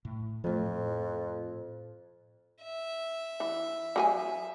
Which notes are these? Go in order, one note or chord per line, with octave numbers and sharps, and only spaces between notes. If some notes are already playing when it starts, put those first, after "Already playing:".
A2
F2 F3 A3
A2
E5
E3
F#3 G#4 G#5